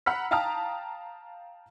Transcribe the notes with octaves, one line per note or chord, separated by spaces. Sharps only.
F#5 A#5 B5 E6 F6 B6
F5 G5 A5 A#5 D#6 F6